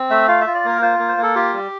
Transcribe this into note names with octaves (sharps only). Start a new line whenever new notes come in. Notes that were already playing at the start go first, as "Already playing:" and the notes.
Already playing: C4
A3 E5
F4 F5
E5
F4
D5
A#3 A#4
F4 C5
A#3
C5
A#3
A4
F4 G4
G3